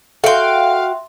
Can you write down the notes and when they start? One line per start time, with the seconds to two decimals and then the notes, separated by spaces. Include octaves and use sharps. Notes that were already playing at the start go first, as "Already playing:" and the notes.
0.24 F#4 A4 E5 F5 G5 C6